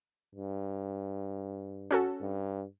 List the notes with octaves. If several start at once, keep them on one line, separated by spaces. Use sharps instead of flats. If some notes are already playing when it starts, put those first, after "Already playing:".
G2
C#4 F#4 A4
G2